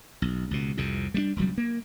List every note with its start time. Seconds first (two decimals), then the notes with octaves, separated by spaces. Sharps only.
0.22 B1
0.51 C#2 B2
0.77 C2 F2 C3
1.14 G3 A3 D4
1.36 E1 C#2 F#3 G3
1.58 A#3